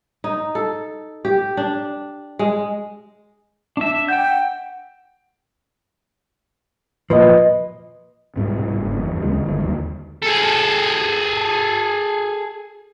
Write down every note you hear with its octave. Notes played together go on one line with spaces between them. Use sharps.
D#4
A4
G4
D4
G#3
D4 E5
F#5 G5 G6
A#2 F3 B4 D#5
C2 G#2 B2 G3
F#1 G2
E2 G2
D2 C#3 G#3
G1 D3 D#3 G3
D#2 D3
G#4 A4